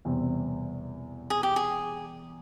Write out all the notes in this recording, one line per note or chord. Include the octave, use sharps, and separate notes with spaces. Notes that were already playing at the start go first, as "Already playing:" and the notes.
E1 E2 C3 G3 C4
G#4
G4
G#4